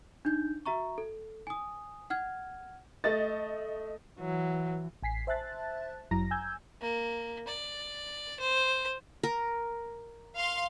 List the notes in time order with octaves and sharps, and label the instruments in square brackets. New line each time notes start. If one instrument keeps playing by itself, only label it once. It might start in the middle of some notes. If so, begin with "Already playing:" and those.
[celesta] D4 D#4 G6
F#4 E5 A#5 C#6
A4
G#5 D#6
F#5 F6 G#6
[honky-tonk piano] A3 D#5 A6
[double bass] E3 [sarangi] F#3
[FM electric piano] A1 G#5 B6 C7
C5 E5 A5 F#6 A6
G1 F#2 F#3 E4 A#5 A#6
G#5 E6 G6 G#6
[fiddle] A#3
D5
C5
[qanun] A#4
[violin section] F5 C6